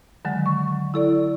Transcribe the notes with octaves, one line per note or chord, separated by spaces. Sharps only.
D3 D#3 F#3 G#3
C#6
E4 A4 D5